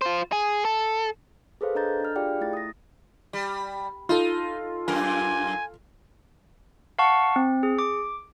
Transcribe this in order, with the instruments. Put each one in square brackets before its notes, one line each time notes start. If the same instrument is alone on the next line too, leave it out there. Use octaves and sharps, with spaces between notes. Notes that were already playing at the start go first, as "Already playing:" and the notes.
[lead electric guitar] F4 C5
G#4
A4
[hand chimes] G#4 A4 B4 C5 F5
D4 A4 D#5 A#5 G6 A6
D4 F6
F4 G4 G#4 D5 F5 G5
A3 E4 A6
D#6 A#6
[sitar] G3
[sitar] D#4 [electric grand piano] F4 A4
[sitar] F#2 A#2 A#4 [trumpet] G#5
[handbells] F5 F#5 A5 C#6
C4
G#4
D6